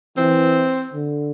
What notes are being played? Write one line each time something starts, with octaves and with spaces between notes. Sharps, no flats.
E3 C4
D3